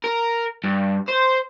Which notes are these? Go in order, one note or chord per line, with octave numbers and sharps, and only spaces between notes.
A#4
G2
C5